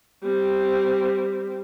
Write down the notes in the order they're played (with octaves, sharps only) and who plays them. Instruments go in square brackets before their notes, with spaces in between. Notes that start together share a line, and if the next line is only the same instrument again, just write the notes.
[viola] G3 C4